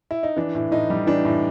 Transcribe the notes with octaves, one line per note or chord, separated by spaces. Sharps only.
E4
D#4
E3 D4
A2
A2 D#4
G3
E3 D4
A2